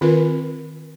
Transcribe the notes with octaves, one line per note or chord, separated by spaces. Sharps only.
D#3 C4 F4 A#4 B4